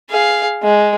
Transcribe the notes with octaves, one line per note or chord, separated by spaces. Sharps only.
G#4 F5
G#3